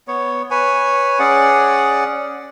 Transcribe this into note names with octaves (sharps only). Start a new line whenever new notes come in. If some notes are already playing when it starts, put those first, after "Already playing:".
B3 C#5
B4 C#5 G#5
C#4 G#4 D5 F#5